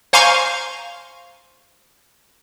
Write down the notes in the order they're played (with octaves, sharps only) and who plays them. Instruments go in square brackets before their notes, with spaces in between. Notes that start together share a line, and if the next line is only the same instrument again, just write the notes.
[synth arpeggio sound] C5 F5 G#5 A#5 C6 C#6